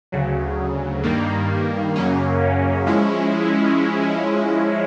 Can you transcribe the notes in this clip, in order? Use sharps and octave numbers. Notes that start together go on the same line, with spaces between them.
D2 C#3 F#3
G2 D#3 G3 A#3
F#2 C#3 F#3 A#3 C#4
F3 G#3 C#4 E4